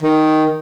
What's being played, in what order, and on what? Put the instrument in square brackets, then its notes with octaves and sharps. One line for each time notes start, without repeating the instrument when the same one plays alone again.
[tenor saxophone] D#3